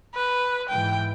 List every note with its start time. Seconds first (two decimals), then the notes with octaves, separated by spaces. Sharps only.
0.15 B4
0.70 G#2 E3 G5